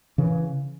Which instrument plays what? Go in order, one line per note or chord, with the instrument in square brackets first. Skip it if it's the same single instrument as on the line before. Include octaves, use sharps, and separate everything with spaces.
[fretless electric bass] C#3 E3